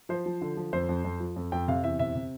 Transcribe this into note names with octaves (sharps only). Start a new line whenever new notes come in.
F3 C5
F3
D3
F3
F2 C5
F2
F2
F3
F2
F2 G5
C3 F5
E2 E5
C3 E5
C3